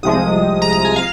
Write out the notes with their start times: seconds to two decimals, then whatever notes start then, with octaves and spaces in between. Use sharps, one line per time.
0.03 C2 C3 F3 G#3 D#6
0.62 A#5
0.73 A#5
0.85 G#5
0.96 F5